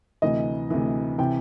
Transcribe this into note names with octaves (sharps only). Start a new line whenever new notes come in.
D2 C3 E3 D#5
D2 C3 E3
C3 E3 G5